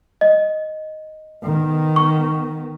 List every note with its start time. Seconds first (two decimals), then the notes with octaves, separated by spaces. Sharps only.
0.21 D#5
1.44 D#3 B3
1.96 C#6